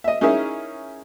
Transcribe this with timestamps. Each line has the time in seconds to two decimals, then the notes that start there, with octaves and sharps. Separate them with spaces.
0.04 D#5 E5
0.21 C#4 D#4 E4 G#4 A#4 E5